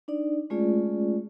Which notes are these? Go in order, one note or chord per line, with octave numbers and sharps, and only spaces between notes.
D4 D#4 D5
G#3 A3 C#4 F4 G#4 D5